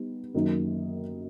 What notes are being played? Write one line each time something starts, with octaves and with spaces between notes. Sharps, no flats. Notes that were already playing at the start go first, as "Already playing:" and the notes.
Already playing: G3 B3 D#4
F#2 D#3 F#3 A#3 D#4